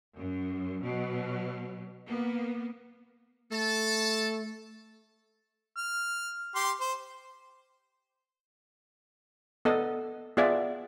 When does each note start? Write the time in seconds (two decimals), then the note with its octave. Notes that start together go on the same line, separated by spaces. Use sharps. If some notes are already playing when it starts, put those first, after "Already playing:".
0.15 F#2
0.81 B2 F#3
2.08 A#3 B3
3.51 A3 A4 A5
5.77 F6
6.55 G4 C6
6.80 C5
9.65 B3 A4 D#5
10.37 B3 F4 G#4 D5 E5